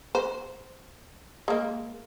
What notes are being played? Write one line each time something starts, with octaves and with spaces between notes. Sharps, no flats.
C5
G#3 A#3